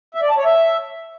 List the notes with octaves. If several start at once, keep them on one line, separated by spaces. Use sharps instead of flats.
E5
D5
A5
C#5
E5